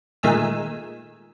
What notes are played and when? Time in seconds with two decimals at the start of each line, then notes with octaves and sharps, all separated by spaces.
0.23 A#2 D#3 G#3 A3 G#5 E6